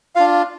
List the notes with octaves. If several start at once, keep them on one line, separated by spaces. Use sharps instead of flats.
D4 F4 F5